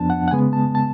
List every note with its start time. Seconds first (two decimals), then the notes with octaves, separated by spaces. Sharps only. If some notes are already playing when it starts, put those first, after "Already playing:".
Already playing: F2 F3 B3 D4 A5
0.10 F#5
0.28 F#5
0.31 C#3 G#3 B3 G#5
0.53 A5
0.75 A5